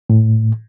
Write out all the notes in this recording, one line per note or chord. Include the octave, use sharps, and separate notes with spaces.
A2